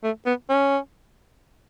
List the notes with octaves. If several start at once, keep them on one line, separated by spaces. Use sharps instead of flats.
A3
B3
C#4